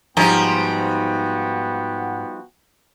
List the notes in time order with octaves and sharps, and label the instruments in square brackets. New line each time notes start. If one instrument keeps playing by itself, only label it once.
[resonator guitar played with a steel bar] G#2 A#5 [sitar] F3 G3 D#4 [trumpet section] B3 F#4 G5